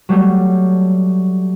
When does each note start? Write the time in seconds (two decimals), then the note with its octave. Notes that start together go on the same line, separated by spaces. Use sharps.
0.09 F#3 G3 A3